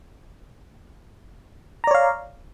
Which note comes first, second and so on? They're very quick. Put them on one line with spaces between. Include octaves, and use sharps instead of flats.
A#5 D5 C#5 F5